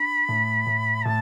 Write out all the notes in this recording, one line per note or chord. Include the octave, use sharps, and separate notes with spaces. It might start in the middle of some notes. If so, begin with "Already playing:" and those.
Already playing: D4 B5
A2
A2
A2 A5